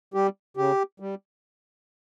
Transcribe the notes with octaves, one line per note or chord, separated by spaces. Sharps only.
G3 G4
C#3 G4
G3